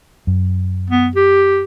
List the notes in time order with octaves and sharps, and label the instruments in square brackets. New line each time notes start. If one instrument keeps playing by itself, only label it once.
[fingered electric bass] F#2
[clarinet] B3
G4